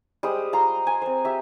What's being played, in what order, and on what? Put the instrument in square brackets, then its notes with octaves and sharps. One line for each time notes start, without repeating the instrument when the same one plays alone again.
[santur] G3 G#3 C5 D#6
F4 A#5 C6
G#5
C4 C5
G4 E5